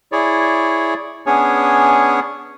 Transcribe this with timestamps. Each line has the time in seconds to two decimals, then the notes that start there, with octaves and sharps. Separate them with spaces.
0.12 E4 G#4 C#5 D5
1.26 B3 C#4 D4 G#4 C#5